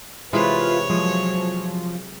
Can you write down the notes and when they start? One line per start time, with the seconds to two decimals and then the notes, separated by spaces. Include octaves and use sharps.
0.33 C3 E3 G#3 F4 B4 C#5
0.90 F3 F#3 G#3